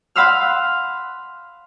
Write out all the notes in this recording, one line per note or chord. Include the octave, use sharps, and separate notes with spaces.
F5 F#5 B5 C6 E6 F6